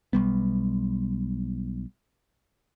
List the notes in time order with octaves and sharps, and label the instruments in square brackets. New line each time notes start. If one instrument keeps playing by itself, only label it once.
[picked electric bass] B1 G3 B3